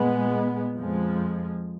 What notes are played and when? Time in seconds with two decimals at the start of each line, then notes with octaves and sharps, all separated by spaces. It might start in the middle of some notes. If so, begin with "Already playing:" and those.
Already playing: A#2 G#3 B3
0.77 F2 F3 G#3